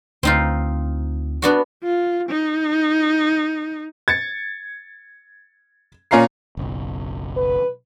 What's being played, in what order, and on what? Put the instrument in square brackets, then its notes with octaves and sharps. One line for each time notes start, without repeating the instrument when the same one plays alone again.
[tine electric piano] D2 [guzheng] C4 D#4 F4
[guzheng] B3 D4 F#4
[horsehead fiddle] F4
D#4
[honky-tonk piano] G#6 A6 C#7
A#2 C#4 F4 A#5 C7
[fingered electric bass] F#1 B1
[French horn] B4